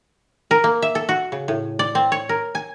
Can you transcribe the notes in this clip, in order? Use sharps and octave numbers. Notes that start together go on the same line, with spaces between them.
A#4
A#3
E5
A4
F#4
C#3
A2
D5
C4
C#5
A#4
G#5